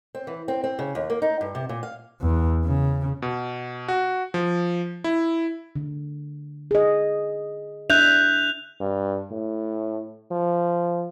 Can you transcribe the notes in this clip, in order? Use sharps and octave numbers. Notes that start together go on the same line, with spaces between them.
C4
E3
C4
C4
C#3
D#2
A#3
D#4
G2
C3
A#2
F5
E2
C#3
B2
F#4
F3
E4
D3
G#4 D#5
D4 E5 F#6 G6 F7
G2
A2
F3